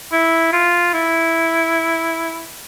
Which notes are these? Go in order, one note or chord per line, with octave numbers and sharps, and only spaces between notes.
E4
F4
E4